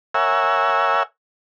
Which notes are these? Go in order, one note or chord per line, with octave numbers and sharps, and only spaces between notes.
A#4 C#5 E5 F#5 G#5 E6